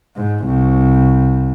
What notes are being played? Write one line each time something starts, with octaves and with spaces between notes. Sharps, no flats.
G#2
C2